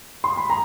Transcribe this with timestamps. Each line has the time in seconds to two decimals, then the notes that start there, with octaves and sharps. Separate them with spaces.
0.24 C6
0.37 B5
0.50 A#5